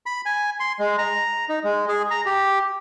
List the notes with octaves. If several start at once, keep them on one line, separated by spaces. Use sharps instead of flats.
B5
G#5
C6
G#3
A#5
D#4
G#3
G#4
A#5
G4